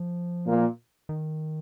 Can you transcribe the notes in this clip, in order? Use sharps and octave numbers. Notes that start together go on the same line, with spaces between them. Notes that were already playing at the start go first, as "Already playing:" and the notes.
Already playing: F3
A#2 A#3
D#3